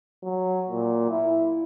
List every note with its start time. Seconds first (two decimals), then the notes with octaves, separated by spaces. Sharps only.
0.23 F#3
0.69 A#2
1.09 E4